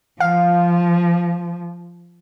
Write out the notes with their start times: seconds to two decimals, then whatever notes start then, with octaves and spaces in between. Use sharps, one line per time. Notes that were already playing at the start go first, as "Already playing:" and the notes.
0.20 F3 F5